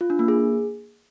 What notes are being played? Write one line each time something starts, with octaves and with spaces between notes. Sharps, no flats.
F4
D4
A#3
G#4